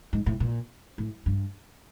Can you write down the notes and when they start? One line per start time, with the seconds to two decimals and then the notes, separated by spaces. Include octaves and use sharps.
0.13 G#2
0.26 A2
0.40 A#2
0.98 A2
1.26 G2